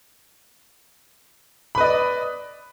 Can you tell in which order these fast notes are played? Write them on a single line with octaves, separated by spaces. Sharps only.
B5 B4 D#5 D5